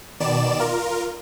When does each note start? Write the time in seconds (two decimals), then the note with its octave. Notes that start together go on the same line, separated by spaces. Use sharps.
0.20 B2 D#3 D5 E7
0.60 F4 A#4